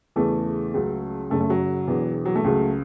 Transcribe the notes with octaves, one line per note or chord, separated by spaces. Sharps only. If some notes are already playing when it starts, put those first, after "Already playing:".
E2 C#3 E3 A3
C#2 C#3 F#3
F#1 F#2 C#3 A3
A3
F#3
E1 E2 E3
F#3
A3
C#2 C#3 F#3